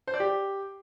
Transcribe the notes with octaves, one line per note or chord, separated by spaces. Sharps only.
C5
D5
G4